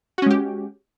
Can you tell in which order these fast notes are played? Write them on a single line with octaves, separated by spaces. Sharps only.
F#4 C#4 G#3 G4